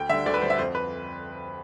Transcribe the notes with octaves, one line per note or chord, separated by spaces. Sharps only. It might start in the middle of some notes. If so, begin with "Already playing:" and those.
Already playing: D2 G5
D3 G3 E5
D2 D5
B4
D3 G3 C5
E5
F2 C5
B4